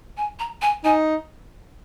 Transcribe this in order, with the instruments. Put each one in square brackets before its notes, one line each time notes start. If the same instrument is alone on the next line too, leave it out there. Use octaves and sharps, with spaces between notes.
[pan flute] G#5
A#5
G#5
[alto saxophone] D#4 [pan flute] G#5